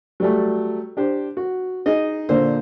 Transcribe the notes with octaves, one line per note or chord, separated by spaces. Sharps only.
F#3 G3 A3
D4 G4 C5
F#4
D#4 G#4 D#5
A#2 D3 C5